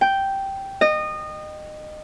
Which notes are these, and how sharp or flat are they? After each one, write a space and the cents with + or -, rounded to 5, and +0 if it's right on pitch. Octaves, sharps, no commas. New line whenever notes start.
G5 -5
D#5 -25